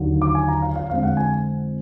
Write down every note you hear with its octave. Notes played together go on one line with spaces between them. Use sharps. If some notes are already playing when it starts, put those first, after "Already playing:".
Already playing: D#2 D3 F#3
D6
G#5
A#5
F5
F5
F2 D3 G#3 F5
F#5
G#5